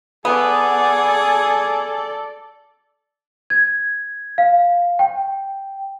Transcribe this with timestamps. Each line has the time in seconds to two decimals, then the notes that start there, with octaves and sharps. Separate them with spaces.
0.25 B3 G#4 A4 D5
3.50 G#6
4.38 F5
4.99 G5